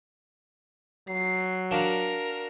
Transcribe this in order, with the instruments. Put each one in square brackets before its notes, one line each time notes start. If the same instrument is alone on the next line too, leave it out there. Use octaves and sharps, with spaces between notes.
[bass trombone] F#3 [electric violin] C7
[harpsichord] D4 F#4 F5 [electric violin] A#4